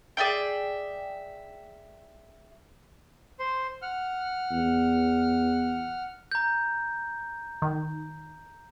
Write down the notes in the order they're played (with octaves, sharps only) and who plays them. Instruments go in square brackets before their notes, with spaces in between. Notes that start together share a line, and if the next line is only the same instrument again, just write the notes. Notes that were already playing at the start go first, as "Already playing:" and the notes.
[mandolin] G#4 D5 E5 G5
[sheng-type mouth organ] C5 C6
F#5 F6
[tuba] E2
[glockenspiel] A#5 G6
[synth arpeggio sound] D#3